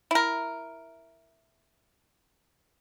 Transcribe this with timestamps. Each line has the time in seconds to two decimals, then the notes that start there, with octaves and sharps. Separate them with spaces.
0.11 E4 A#4